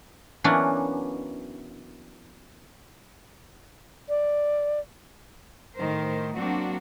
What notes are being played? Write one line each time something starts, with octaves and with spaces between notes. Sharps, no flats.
E3 F#3 A#3 B3 C#4 D4
D5
A2 D#3 A#4 C5
F#3 A#3 C4 D4 F#4